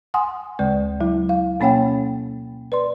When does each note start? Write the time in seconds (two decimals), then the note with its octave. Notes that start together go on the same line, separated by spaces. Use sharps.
0.14 F#5 G#5 C6 D#6
0.59 D2 C#3 G#3 D5
1.01 F#3 E4
1.29 F5
1.60 B2 A#3 C#4 C#5 F#5 G5
2.72 B4 D5 C6